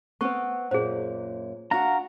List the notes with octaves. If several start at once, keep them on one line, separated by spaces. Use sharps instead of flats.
B3 C4 B4 C#6
F#2 A#2 G#4 C5
D4 F#4 F5 A#5